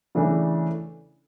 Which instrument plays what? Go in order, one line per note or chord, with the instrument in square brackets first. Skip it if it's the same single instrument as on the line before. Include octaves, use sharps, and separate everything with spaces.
[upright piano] C#3 E3 A3 D4